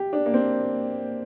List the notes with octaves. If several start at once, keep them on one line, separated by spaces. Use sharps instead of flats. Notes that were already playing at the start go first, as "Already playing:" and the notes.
Already playing: G4
D4
A#3
C4